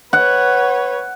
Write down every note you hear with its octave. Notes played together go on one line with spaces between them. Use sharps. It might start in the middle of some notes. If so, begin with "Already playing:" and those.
B4 C#5 F#5